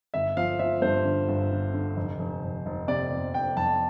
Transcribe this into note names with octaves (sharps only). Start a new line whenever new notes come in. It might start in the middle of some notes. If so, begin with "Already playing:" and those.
G1 E5
F3 F5
F3 E5
G2 C5
D3
G1
D3
D3
F1
F1
F1
F1
C3 D5
F2
F1 G5
F1 A5